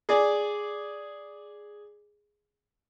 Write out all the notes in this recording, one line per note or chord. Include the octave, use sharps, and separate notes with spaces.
G#4 D5